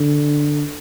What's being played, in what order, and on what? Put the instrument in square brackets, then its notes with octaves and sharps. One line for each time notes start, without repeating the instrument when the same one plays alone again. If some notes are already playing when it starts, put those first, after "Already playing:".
Already playing: [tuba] D3